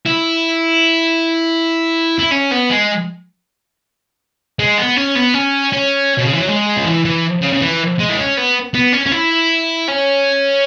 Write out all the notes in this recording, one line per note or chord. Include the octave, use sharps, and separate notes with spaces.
E4
E4
C#4
B3
G#3
G#3
B3
C#4
B3
C#4
C#4
B2
C#3
E3
F#3
G#3
C#3
E3
E3
C#3
C#3
E3
G#3
E4
C#4
B3
B3
C#4
C#4
E4
C#4